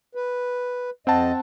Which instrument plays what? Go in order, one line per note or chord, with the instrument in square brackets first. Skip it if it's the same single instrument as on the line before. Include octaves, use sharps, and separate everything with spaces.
[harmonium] B4
[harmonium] F2 D#5 [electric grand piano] C4 F#5 A5